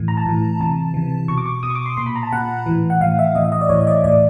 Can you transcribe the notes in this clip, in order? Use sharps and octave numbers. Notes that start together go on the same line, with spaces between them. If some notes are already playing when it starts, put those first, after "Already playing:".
Already playing: A2 E3
A#5
A5
A2 E3
C3 E3 A5
C3 E3
B2 C#6
D6
C#6
B2 D#6
C#6
D6
C6
A#2 C6
B5
A#5
A5
A#2 F#5
A2 E3
F#5
A2 E3 F5
E5
A2 E3 D#5
E5
D#5
D5
A2 E3 C#5
D#5
D5
A2 E3 D5